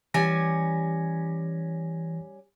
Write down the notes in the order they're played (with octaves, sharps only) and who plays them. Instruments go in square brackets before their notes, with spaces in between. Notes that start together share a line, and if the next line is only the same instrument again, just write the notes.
[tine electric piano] E3 A#6 [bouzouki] G3 C#4 G#5